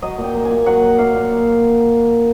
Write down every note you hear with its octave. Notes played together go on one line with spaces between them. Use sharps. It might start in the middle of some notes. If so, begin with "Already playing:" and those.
F#3 D#5
A#2
G5
A#3
G#5
A#2
F#3 F#5
F#3
A#3 F5
A#2